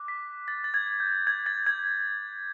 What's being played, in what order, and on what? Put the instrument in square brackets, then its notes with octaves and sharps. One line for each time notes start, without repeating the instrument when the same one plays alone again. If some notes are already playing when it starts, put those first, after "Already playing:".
Already playing: [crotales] D6 F#6
B6
A6
A6
G#6
G6
G#6
A6
G#6